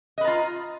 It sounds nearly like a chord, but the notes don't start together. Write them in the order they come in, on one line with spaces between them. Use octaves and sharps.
D#5 B4 A#5 F4